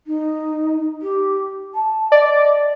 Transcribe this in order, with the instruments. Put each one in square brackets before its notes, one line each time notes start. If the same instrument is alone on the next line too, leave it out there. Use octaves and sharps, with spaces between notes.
[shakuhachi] D#4
G4
A5
[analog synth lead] D5 [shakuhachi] D#5